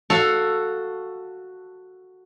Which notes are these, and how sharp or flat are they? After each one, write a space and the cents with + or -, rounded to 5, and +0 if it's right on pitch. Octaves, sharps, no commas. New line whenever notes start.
F#4 +0 A4 +10 F5 +10